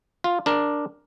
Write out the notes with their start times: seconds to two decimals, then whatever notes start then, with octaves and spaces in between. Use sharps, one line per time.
0.24 F4
0.46 D4 A#4